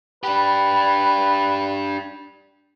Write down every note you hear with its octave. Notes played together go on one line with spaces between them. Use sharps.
D4 G4 B4